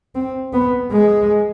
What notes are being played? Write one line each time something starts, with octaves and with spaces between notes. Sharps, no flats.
C4
B3
G#3